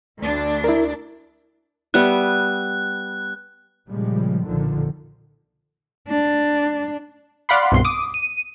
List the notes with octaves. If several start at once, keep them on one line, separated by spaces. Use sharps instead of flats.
D2 D4
E4 A#4
G3 B3 E5 F#6
A#2 C#3 F3 G3 G#3
B1 F2 A#2 D3 D#3 F3
D4
D5 F5 F#5 B5 C6
C2 G2 B2 C6
D6 D#6
D#7